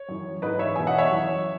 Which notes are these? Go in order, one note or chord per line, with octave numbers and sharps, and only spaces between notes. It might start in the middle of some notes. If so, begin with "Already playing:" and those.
Already playing: C#5
F#2 E3
G#2 E3 B4 D#5
C#5 E5
E2 B2 E5 G#5
D#5 F#5
C#5 E5
F#2 E3